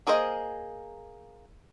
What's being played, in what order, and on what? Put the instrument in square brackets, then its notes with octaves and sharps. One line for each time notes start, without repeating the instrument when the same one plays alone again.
[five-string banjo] A#3 G#4 A#4 C5 D#5